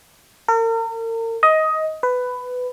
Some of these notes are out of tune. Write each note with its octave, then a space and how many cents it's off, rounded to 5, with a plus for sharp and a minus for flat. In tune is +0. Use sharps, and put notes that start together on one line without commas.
A#4 -40
D#5 +15
B4 +15